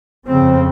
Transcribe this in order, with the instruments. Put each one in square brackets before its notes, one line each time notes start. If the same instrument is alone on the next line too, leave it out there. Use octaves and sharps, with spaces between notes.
[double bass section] F2 C#3 C4